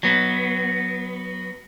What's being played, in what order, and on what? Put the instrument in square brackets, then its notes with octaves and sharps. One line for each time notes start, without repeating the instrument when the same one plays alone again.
[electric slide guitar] F#3 B3